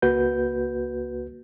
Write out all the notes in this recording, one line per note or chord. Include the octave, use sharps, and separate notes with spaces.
C#2 A#3 F#4 B4 G6